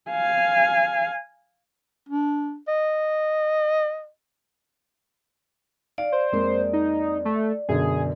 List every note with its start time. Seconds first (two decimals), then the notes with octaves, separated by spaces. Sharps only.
0.10 F5 G#5
2.09 D4
2.68 D#5
5.98 D5 F5
6.12 C5
6.32 F2 G#3 A#3
6.73 D#4
7.25 A3
7.69 F#2 B2 D3 G#4